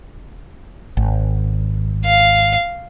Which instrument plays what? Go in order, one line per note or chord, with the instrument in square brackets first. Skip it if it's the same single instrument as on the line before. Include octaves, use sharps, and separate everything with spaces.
[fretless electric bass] G#1
[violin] F5